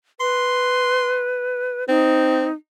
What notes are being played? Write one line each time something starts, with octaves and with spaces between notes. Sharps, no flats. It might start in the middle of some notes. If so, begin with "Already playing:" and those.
B4 C6
C4 D#4